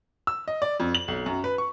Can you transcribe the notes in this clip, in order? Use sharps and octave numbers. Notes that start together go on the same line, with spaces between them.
E6
D#5
D5
F2
F#7
B1
F#2
B4
C#6